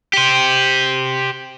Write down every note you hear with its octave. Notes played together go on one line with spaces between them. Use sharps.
G4 C5